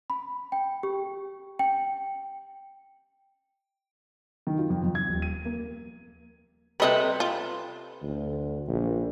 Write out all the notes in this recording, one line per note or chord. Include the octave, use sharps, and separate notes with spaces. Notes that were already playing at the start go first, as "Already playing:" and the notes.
B5
G5
G4
G5
D#3
F4
F2
F2
G#6
D#1
D#7
A#3
C3 G3 A4 B4 D#5 E5
F4
D2
A#1